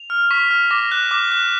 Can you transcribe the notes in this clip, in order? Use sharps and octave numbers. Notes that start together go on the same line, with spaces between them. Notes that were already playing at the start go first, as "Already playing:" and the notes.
Already playing: F7
F6
C#6 B6
F6
D6 A#6
F#6
D6
F#6